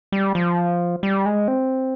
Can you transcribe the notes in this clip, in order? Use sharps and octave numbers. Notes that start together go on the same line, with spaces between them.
G3
F3
G3
G#3
C4